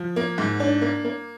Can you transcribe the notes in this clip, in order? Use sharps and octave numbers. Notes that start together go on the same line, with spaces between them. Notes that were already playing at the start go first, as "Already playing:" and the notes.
Already playing: F3
A#3
G#2
D4
A#3
A#3